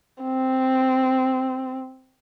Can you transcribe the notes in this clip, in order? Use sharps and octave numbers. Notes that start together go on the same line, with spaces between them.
C4